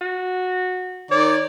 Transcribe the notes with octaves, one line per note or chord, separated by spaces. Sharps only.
F#4
D#3 C#5 D5